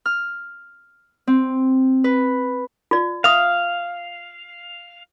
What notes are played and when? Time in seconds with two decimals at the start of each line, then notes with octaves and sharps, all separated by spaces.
0.06 F6
1.27 C4
2.04 B4
2.91 F4 D5
3.24 E5 F5 D#6